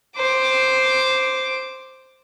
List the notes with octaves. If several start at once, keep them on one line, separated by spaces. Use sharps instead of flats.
C5 D6